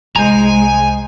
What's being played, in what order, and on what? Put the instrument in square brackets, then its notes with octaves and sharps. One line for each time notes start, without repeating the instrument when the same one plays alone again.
[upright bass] C2 [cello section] G#3 [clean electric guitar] C5 A#5 [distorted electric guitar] G#5